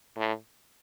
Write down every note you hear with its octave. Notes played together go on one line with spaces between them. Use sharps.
A2